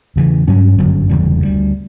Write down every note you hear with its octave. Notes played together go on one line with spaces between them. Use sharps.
E2 C#3 E3
G2 F#3 C#4
G1 F#2 D3 F#3
F#1 E2 D3 G3
D2 D3 G3